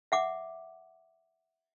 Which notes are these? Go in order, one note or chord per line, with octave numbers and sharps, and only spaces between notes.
E5 F#5 D6